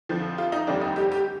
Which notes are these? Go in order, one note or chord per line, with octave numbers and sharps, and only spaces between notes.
F2 D3 F3 C4
F4
D#4
F1 D#2 D3 G3 C4 D4
D#4
G4
G4